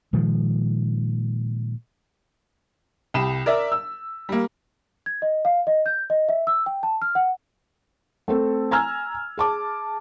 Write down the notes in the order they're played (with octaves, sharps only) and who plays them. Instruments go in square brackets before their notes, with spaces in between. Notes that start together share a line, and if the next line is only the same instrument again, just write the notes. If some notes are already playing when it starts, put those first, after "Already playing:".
[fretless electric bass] A#2 D#3 F3 G#3
[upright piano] C2 G4 B5 E7
A#4 D5 E5
E6
G3 A#3
[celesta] G#6
D#5
F5
D#5
G6
D#5
E5
E6
G5
A5
F6
F#5
[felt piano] A3 C4 A4
G#5 A#5 E6 F6 G#6
G#4 A5 D6